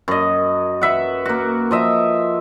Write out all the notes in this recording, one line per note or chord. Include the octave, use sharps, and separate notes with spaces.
F#2 D#5
B4 E5 F#5
A#3 F#4
F3 D#5 E5